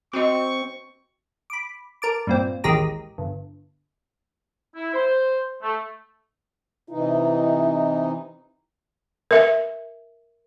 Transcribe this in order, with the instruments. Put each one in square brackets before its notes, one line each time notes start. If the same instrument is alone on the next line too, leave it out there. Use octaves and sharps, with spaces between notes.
[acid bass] C4 [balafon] F#4 D#5 [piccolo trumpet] C#6
[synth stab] B5 D6
A#4 A5 D6
G2 A#2 C4
A1 D#2 G#3 G4 A#5 D#6
G1
[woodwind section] E4
C5
A3
[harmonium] C3 E3 D#4 [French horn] E4
[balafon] A#4 E5